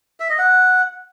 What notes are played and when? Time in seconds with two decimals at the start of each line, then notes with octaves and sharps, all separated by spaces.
0.20 E5
0.29 D#5
0.39 F#5